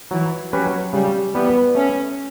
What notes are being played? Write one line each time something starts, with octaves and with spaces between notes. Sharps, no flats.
E3 F#3
F#3 C#4 G4 B4
C#3 G3
E3 G3 B3
A3 C#4